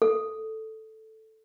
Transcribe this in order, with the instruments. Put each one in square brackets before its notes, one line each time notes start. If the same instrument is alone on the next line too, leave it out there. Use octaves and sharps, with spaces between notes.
[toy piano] A4